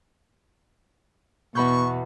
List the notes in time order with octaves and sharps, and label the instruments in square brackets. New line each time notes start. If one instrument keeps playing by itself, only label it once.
[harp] E2 B5 G6 [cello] B2 [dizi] C#6